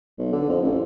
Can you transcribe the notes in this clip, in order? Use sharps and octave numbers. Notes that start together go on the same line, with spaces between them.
B1
D3
F2
A1